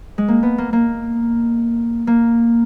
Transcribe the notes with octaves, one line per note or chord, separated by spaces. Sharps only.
G#3
A#3
B3
A#3
A#3
A#3